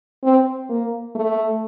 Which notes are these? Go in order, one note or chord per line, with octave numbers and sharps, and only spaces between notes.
C4
A#3
A3